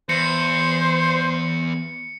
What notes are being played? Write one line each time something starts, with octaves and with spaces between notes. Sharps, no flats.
E2 C5 C#7